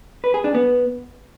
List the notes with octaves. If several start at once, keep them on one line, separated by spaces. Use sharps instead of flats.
B4
G#4
D4
B3